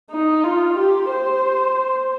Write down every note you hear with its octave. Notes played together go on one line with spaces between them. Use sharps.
D#4
F4
G4
C5